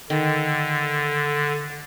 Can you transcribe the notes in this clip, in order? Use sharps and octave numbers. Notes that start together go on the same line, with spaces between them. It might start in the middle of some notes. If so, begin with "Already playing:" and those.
D3 D#3